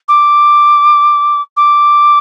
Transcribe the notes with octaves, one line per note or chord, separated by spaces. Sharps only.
D6
D6